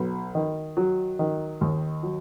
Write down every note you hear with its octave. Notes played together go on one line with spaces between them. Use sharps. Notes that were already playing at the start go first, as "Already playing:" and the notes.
Already playing: B1
D#3
F#3
D#3
D#2
F#3